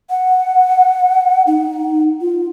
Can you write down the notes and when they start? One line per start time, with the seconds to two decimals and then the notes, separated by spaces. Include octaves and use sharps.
0.10 F#5
1.47 D#4
2.21 F4